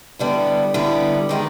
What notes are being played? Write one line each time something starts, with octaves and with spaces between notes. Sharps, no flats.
D3 G3 B3 E4
D3 G3 B3 E4
C3 D#3 G#3 B3